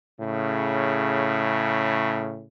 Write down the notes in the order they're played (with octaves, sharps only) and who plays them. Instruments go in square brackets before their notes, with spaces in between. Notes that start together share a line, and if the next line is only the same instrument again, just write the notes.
[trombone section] A2 C#3